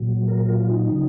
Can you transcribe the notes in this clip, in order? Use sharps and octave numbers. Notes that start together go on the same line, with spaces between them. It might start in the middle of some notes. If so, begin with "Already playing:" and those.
Already playing: A#2 F#3
A#4
F4
D#4
C#3 F#3